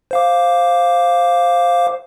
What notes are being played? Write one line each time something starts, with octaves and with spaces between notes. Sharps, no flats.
C5 F5 D6